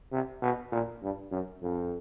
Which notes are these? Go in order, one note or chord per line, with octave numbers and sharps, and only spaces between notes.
C3
B2
A#2
G2
F#2
F2